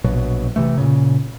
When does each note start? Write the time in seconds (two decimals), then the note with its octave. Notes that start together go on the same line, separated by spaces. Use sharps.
0.04 A#1 B2 F#3
0.56 C3 E3 A3
0.78 A#2 C#3